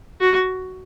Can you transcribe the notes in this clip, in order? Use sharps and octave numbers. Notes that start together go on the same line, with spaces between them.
F#4